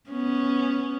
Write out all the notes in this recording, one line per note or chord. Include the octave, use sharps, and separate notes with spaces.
B3 C#4